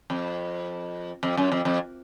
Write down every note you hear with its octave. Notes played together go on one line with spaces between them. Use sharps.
F2
F2
F#2
F2
F2